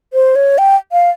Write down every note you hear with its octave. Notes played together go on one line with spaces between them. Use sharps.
C5
C#5
G5
F5